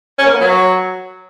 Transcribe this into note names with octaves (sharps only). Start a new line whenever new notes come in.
C#4
A#3
B3
F#3